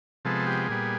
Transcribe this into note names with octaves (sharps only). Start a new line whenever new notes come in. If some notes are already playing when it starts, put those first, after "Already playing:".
C3 F3 G#3 B3 A4
G4
A#2 G3 B3 G#4